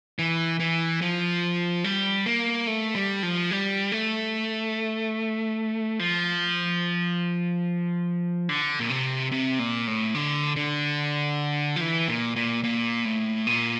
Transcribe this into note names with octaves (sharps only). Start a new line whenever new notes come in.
E3
E3
F3
G3
A#3
A3
G3
F3
G3
A3
F3
D3
A#2
C3
C3
A#2
A2
D3
D3
F3
E3
A#2
A#2
A#2
A2
A#2